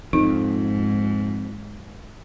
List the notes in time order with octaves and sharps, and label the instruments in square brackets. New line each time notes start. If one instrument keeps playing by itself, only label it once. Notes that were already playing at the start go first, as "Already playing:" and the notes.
[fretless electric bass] F2 [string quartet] G#2 [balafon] D#4